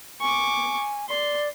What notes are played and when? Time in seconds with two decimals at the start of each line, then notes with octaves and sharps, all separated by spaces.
0.21 G#5 C#6 D6
1.09 D5 C6